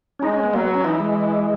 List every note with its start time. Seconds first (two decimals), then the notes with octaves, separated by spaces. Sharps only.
0.19 C#4
0.23 G#3 D#4
0.33 C#4
0.44 B3
0.54 F#3 A#3
0.64 B3
0.74 C#4
0.84 E3 D#4
1.00 G#3